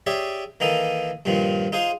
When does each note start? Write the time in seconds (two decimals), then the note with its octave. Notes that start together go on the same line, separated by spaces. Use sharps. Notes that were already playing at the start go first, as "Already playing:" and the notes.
0.07 G4 G#4 C#5 D5 E5
0.60 D#3 E3 A#3 D#4 A4
1.25 G2 A#2 D#3 F3
1.72 D#4 F4 G#4 C5